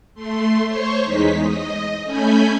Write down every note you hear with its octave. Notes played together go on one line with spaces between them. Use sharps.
A3 C6
C5 C#5 C#6
E2 G#3 D#4 B6
D#5
A3 C#4 G#5 B5 G6